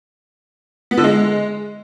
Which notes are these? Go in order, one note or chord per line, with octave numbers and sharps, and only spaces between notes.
B3
D3
G#3